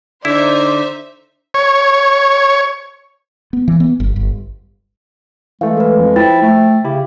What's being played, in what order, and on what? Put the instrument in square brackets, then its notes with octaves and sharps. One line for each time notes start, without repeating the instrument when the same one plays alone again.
[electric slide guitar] D3 [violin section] D#4 C5 E5 [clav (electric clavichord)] E4 [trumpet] D5
[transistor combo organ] C#5
[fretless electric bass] B3
E3
B3
G1
G1
[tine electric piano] E3 A3 [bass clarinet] G#3 [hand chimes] F5
[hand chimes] A4 B4
[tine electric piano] F2
[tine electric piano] F3 [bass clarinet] E4 [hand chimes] G5 A6
[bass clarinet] A3
[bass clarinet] C#3 [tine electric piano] E4 G4